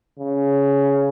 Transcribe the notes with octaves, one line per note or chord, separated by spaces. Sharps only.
C#3